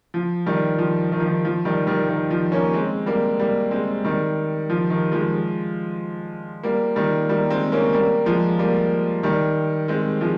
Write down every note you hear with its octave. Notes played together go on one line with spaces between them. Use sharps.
F3
D#3 G3
F3
D#3
F3
D#3
F3
D#3 G3
D#3 G3
D#3
F3
A#3 C#4
G#3 C4
G3 A#3
G3 A#3
G#3 C4
D#3 G3
F3
D#3
F3 G#3
G3 A#3
D#3 G3
G3 A#3
G#3 C4
A#3 C#4
G3 A#3
F3 G#3
G3 A#3
D#3 G3
G#3 C4
F3 G#3